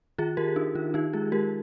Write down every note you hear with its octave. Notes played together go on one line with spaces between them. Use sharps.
D#3 F4 G#4
D#3 G4 A#4
D4 D#4
D#3 F4
D#3 D#4 G4
G#3 F4 G#4
G#3 G4 A#4